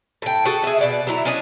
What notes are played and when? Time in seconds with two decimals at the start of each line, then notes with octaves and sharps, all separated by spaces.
0.22 A2 G5
0.45 F#4 G#4 A4
0.63 G#4 E5
0.79 B2 D5 F#5
1.07 F#3 E4 A#5
1.25 C#4 D4 C#5 D#5